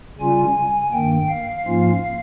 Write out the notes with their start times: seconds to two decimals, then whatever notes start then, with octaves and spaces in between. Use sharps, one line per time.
0.19 C#3 G3 C#4 F4 G#5
0.92 G2 D#3 A#3 G5
1.29 F5
1.65 G#2 F3 A#3 C#4 F4